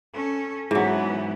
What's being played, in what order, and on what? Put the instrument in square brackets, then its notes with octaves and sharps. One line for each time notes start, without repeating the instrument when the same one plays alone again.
[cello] C#4 A4
[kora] G#2 F#3 [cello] E3 B3